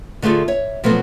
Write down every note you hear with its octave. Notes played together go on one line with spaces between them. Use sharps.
D3 A3 F4 G#4 A4
C#5 E5
B2 F3 F#3 A3 B3 C4